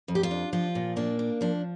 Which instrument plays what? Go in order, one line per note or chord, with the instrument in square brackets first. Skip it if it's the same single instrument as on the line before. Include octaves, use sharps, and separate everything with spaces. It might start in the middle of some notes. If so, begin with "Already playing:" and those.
[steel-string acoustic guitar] F2
G4
F4
D4
F3 F4
A#2
A#3 D4
D4
F3 D4